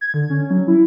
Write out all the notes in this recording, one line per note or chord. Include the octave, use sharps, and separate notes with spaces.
G#6
D3
C#4
F#3
E4